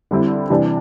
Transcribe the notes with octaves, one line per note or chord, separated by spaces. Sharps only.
D3 G3 C4 E4
C3 E3 G3 D4